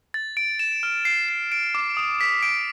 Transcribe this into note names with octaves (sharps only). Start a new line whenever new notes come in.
A6
D7
E7
F6
C7
C7
D7
D6
D#6
B6
D7